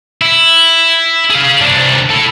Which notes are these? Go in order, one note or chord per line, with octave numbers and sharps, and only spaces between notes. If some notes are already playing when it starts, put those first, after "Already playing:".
E4
G#4 F5
C2 D4
E4 A4